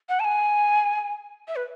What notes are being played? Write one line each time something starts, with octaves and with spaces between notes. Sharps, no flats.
F#5
A5
G#5
E5
B4